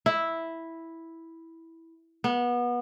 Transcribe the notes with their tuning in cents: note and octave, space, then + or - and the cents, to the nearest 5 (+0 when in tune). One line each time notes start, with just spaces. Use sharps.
E4 -5
B3 -25